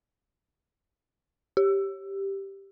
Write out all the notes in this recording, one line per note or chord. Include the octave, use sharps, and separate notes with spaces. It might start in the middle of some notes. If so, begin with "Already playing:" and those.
G4